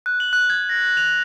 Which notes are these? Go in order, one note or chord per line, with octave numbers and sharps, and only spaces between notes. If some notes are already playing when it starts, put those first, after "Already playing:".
F#6
F#7
F#6
G#6
A#6
F7